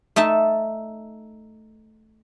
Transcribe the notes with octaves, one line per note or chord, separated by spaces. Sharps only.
A3 D#4 E5 A5